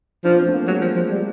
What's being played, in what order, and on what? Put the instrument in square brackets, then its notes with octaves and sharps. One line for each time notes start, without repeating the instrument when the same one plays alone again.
[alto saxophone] F3 [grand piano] D4
[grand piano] B3
C4
A3
A#3
[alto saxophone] F#3 [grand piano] G#3
[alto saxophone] F3
F3
G3